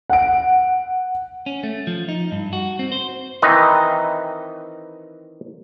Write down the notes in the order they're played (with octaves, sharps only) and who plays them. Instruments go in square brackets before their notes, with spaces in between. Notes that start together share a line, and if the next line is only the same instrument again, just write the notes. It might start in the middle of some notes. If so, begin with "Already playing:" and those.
[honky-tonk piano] F#5 D7
[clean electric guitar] C#4
A3
F3
D#4
G2
F#4
C4
C5
[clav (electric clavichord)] D#3 E3 C4 D#4 B4